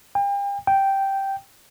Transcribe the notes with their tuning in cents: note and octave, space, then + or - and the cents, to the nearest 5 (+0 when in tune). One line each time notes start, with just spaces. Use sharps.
G5 +40
G5 -5